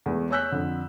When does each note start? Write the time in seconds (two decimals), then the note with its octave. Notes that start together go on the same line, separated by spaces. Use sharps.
0.06 E2 G#3 A3
0.30 C#5 G#5 E6 F#6 G6 B6
0.52 F2 D3